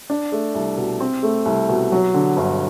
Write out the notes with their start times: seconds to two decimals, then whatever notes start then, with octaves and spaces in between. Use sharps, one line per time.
0.10 D4
0.32 A3
0.55 C2
0.77 B2
1.00 C4
1.23 A3
1.45 C2
1.69 B2
1.92 F#3
2.14 D3
2.37 G1